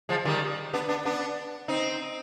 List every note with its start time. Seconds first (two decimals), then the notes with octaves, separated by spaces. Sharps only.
0.09 F3 G#3
0.25 D#3 G3
0.73 B3 D4
0.89 B3 D4
1.05 B3 D4
1.68 C4 D#4